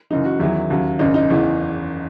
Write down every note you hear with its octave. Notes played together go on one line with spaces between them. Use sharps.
F#1 F#2 E3 D#4
F#4
E2 D#3 F#3 E4
D#2 C#3 F#3
G#1 F#2 C#3 D#4
D#4
F#1 E2 C#3 E3